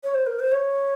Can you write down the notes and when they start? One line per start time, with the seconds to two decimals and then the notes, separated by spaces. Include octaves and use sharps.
0.04 C#5
0.14 C5
0.27 A#4
0.40 C5
0.52 C#5